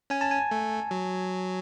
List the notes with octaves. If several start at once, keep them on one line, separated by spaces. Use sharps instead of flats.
C#4 G#5
A5
G#5
A3
F#3